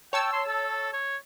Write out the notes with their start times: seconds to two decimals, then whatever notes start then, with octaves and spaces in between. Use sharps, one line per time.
0.13 C#5 G5 A5 E6
0.33 C6
0.48 A4
0.93 C#5